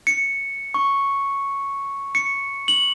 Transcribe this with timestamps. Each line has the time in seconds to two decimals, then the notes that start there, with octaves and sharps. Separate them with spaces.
0.07 C#7
0.74 C#6
2.15 C#7
2.68 F#7